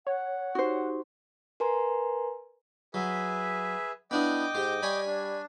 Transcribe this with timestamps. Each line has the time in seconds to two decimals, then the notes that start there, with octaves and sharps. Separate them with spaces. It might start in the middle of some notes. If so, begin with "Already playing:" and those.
0.07 C#5 F#5
0.55 D#4 F#4 G4 C5
1.60 A#4 B4 G#5 A#5 C6
2.94 F#3 G#4 B4 E5
4.11 B3 D4 E4 D#5 G5 D6
4.55 G#2 G4 C5
4.83 G3 C#5 G#5 B5
5.07 D4